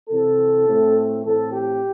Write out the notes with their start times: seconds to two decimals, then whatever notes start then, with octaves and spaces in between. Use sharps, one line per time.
0.09 C3 E3 C4 A4
0.67 A2 A3 C4
1.25 A2 E3 C4 A4
1.53 G4